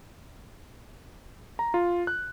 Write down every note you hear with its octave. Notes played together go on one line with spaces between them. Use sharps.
A#5
F4
F#6